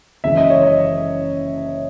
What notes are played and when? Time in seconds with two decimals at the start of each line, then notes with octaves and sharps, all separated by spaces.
0.24 F#1 F#2 E3 G#3 E5
0.37 D#5
0.50 C#5
0.63 D#5